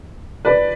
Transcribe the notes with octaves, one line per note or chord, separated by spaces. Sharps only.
B4 D5